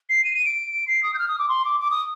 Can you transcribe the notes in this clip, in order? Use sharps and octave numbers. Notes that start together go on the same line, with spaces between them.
C7
D#7
D#7
D7
C7
D#6
G6
F6
D#6
D6
C6
D6
D6
D#6